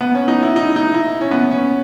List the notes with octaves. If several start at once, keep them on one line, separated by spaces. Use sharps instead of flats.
B3
C#4
D#4
E4
D#4
D#4
E4
C#4
B3
C#4